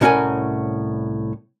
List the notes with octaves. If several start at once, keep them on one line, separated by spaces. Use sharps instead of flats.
C2 A2 C#4 F#4 A#4 G#5